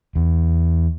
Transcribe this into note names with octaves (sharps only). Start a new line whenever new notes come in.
E2